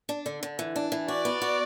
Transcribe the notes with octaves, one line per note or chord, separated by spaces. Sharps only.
D4
D3
D3
E3
D4
E3
F#4 D5
B3
F#4